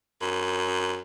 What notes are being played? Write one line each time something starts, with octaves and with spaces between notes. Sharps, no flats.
F#2